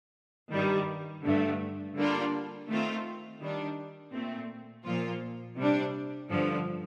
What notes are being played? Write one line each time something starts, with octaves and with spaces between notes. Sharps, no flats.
G2 D#3 G3
G2 D3 A3
D3 G3 A#3 D4 F4
D#3 A3 C4 F4
D#3 G3 D4
A#2 A3 C4
A#2 F3 A#3 F4
C3 G3 D4
G2 D3 F3